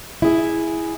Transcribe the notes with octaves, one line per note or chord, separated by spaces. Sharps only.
E4 G#4